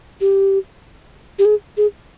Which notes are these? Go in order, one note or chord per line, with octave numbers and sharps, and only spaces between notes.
G4
G4
G#4
G#4